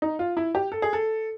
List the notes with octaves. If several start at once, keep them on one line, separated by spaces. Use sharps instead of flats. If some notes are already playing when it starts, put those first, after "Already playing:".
D#4
F4
E4
G4
A4
G#4
A4